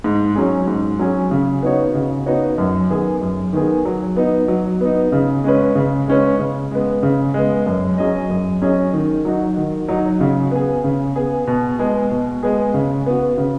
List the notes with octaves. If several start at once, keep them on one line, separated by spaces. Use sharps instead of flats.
G#2
F#3 C#4 G#4
G#2
F#3 C#4 G#4
C#3
B3 D#4 F#4 C#5
C#3
B3 D#4 F#4 C#5
F#2
D#3 B3 G#4
F#2
D#3 B3 G#4
F#3
B3 D#4
F#3
B3 D#4
C#3
G#3 C#4 B4
C#3
G#3 C#4 B4
C#3
G#3 B3
C#3
G#3 B3
F#2
F#3 C#4 G#4 D#5
F#2
F#3 C#4 G#4 D#5
D#3
F#3 D#4 F#4
D#3
F#3 D#4 F#4
C#3
B3 G#4
C#3
B3 G#4
B2
G#3 B3 G#4
B2
G#3 B3 G#4
C#3
B3 F#4
C#3